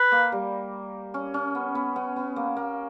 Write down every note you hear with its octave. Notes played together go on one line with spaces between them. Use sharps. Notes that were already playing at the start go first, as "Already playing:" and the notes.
Already playing: B4
A#3
G3
C#4
C#4
B3
B3
B3
B3
A#3
A#3